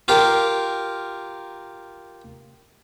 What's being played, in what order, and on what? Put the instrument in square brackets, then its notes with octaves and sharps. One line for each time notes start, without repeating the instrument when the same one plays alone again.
[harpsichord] F4 G4 A#4